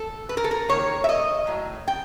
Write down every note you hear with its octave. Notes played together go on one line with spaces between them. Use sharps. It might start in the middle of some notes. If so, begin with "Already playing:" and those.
Already playing: A4
B4
A#4
A4
A#4
D#3 F#3 A#3 C#5
E5
D#5
A2 F#3
G5